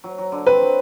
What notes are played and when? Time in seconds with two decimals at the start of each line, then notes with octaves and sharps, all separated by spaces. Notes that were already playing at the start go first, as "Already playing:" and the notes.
0.04 F#3
0.18 F#3
0.32 D3
0.46 C4 B4
0.62 F#3